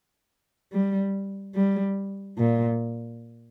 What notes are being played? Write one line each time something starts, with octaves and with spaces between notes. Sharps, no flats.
G3
G3
A#2